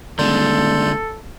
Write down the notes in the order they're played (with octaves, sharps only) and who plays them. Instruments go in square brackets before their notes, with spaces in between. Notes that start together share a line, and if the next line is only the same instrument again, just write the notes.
[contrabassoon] D#1 [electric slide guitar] D3 G#3 [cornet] A4 [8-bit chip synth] D5 C6 G6